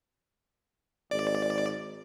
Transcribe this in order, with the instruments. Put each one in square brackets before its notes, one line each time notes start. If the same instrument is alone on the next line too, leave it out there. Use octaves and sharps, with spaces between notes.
[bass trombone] G#1 [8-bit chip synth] D5